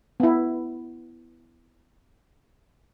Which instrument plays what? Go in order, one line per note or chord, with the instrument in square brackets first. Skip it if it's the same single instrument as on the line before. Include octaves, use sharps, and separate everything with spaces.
[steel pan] B3 E4